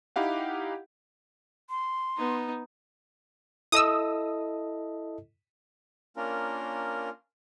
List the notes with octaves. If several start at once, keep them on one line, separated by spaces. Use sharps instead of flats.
D#4 E4 G4 F5 F#5
C6
B3 D#4
E4 A4 D#5 D#6 E6
A#3 C#4 D4 F4 A#4